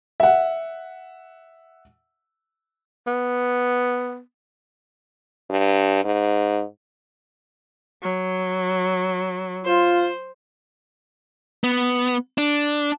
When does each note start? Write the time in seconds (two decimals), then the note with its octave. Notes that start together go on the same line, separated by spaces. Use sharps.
0.20 E5 F#5
3.07 B3
5.50 G2
6.04 G#2
8.03 F#3
9.65 F4 C5
11.64 B3
12.38 D4